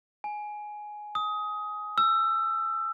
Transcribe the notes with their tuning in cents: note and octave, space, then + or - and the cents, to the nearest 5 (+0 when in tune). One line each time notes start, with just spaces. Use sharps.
G#5 +10
D#6 +20
E6 +25